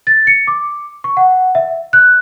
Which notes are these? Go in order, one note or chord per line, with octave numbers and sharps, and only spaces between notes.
A6
C#7
D6
C#6
F#5
E5
F#6